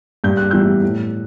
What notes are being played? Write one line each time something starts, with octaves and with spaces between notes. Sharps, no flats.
G2 G6
F#6
E3 G3 B3 E6 G6
A2